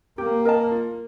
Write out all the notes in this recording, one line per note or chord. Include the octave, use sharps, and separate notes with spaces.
A#3 G4
A#4 D#5 A5
F4